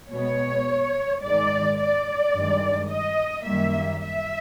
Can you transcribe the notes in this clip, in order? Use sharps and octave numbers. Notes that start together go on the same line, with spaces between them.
B2 G#3 B3 C#5
G#2 D#3 G#3 D5
D5
G2 D#3 G#3
D#5
F#2 D#3 G3 A#3 E5
E5